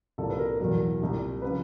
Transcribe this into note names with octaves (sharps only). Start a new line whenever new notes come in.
C2 A#2 G3 A4
B4
A#4
E2 B2 F#3 A#4
C2 A#2 G3
C#3 F3 B4